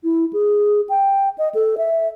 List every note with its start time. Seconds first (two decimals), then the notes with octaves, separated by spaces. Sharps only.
0.04 E4
0.33 G#4
0.89 G5
1.38 D#5
1.55 A4
1.78 E5